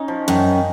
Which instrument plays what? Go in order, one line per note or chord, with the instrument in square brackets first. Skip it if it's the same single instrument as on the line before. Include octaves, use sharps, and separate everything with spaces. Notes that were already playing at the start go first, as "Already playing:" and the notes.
Already playing: [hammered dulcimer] C#4 D#4
F3
[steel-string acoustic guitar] F#2 [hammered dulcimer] D#3